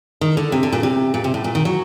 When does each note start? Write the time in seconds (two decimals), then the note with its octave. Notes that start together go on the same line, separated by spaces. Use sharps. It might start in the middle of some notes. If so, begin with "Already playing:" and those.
0.21 D#3
0.37 D3
0.52 C3
0.63 D3
0.72 A#2
0.83 C3
1.14 A#2
1.24 C3
1.34 A2
1.44 A#2
1.55 D#3
1.65 F#3